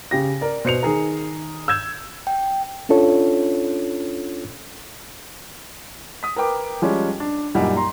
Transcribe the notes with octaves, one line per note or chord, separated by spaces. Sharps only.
C#3 G4 A#6
A#4 D5
B2 C5 C#7 F7
D#3 G#4 A#5
E6 G6 G#6 E7
G5
C#4 D4 F4 A4 C#5
D#6 B6
A#4 B4 G5 D6
F3 G3 G#3 C#4
D4
F#2 A#2 G3 D#4 F#5
A#5 C6